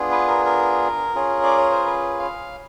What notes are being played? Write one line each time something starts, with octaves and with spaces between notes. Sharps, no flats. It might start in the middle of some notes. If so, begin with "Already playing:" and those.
Already playing: B3 D4 F4 G#4
B4
A#4
A#4
C#4 F4 G#4
D5
C#5
C5
B4
F5